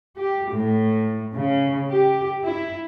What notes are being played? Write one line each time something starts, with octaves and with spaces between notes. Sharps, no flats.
G4
A2
C#3
G4
E4